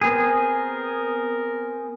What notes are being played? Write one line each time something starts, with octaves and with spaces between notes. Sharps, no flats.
B3 C4 G#4 A#4